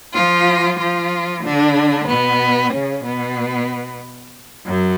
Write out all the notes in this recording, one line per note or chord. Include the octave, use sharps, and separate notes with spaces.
F3 F4
F3 F4
D3 D4
B2 B3
C#3 C#4
B2 B3
F#2 F#3